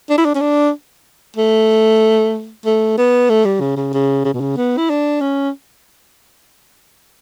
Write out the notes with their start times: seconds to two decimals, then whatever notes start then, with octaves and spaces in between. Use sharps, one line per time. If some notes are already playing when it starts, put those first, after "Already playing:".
0.10 D4
0.18 E4
0.25 D4
0.35 C#4
0.41 D4
1.37 A3
2.65 A3
2.98 B3
3.30 A3
3.45 G3
3.61 C#3
3.77 C#3
3.93 C#3
4.25 C#3
4.34 B2
4.41 C#3
4.57 B3
4.78 E4
4.90 D4
5.21 C#4